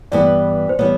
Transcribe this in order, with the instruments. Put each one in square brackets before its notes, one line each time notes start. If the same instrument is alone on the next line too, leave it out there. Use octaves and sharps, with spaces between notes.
[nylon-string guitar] G2 E3 G3 B3 [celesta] D5
[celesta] C5
[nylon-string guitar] E3 G3 B3 [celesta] C#5